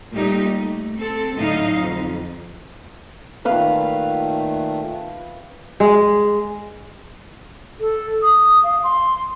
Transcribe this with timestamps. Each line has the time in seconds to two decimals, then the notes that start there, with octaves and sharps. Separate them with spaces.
0.12 A#2 G3 A3 D#4 G4
0.53 A3
0.97 C4 A4
1.37 A2 D3 F#3 D#4 D#5 F5
1.78 F2
3.45 A#2 D#3 A3 B4 F5
5.80 G#3
7.80 A4
8.22 D#6
8.64 F5
8.83 C6